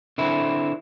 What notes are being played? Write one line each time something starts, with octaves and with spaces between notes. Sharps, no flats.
D3 C4 E4